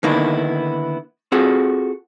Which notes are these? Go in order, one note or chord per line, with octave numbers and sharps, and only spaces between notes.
D3 D#3 A#3 B3 D#4 E4
C4 F4 F#4 G#4 A4